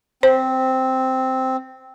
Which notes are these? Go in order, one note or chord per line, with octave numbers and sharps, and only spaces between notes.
C4 C5